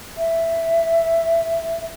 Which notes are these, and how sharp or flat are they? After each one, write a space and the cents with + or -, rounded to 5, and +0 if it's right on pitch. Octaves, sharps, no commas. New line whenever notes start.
E5 +5